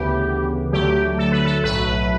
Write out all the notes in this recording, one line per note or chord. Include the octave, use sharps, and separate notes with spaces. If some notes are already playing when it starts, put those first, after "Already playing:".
Already playing: D2 C#3 E3 B3 G4
D2 D3 F#3 A3 G4
A4
B4
A4
B1 A2 F#3 A3 B4